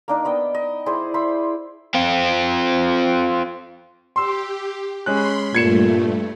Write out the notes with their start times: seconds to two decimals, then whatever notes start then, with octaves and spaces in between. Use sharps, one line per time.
0.08 A#3 D4 D#4
0.25 B3 D#5 G5
0.55 D#5
0.86 E4 G#4 C5 D5
1.14 C5 E5 B5
1.94 C4 F4
4.16 G4 C6 E6
5.06 G#3 C#4 B5 C6 F#6
5.54 G2 A#2 A3 G#6 C#7 E7